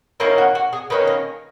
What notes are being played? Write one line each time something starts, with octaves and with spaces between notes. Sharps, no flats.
D#3 A#3 C#4 E4
F#4
F#4
G#4
D#3 A#3 C#4 B4
A#4